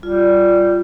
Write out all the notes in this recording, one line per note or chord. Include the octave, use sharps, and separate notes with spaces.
G3 F4